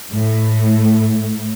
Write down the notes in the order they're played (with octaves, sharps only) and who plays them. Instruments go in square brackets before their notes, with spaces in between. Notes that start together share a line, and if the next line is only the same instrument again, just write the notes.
[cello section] A2